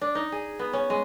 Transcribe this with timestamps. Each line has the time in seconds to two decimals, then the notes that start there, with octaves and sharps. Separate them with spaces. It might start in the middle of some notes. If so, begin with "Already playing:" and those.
0.01 D4
0.15 D#4
0.32 G#4
0.59 B3
0.73 C#4
0.90 G#3